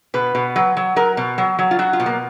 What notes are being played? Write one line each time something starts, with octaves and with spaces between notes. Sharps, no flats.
B2 B4
B2
F#3
F#3
F#3 A#4
B2
F#3
F#3
F4
F#3 F#4
F4
B2
A#3